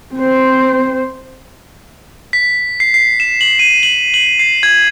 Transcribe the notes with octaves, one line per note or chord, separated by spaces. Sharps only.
C4 C5
B6
C7
C7
E7
F#7
D#7
F#7
F#7
C7
G#6